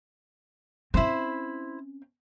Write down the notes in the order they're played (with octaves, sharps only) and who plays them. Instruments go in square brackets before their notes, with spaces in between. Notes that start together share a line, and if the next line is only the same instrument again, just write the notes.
[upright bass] C4 C#4 [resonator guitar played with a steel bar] E4 C5